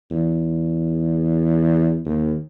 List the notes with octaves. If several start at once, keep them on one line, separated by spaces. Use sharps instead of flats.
E2
D#2